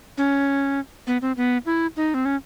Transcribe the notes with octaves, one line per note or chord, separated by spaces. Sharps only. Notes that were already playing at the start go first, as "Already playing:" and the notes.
C#4
B3
C4
B3
E4
D#4
C4
C#4